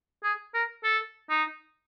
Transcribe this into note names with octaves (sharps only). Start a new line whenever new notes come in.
G#4
A#4
A4
D#4